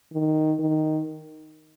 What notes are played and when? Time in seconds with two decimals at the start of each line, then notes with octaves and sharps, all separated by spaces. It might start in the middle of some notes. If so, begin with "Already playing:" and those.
0.13 D#3
0.60 D#3